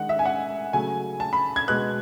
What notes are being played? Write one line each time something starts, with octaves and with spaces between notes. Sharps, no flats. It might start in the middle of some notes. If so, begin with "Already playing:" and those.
Already playing: D#3 G#3 D#4 F#5
E5
G#5
F#5
C#3 F#3 A3 G#5
A5
B5
G#6
B2 G#3 B3 F#6